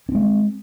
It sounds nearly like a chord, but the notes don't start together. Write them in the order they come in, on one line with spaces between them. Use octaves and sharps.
C#4 C4 G#3